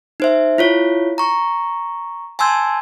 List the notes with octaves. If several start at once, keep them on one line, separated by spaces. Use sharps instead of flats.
D#4 C5 E5
E4 F4 C#5
A#5 C#6
G#5 A5 C6 E6 G6 G#6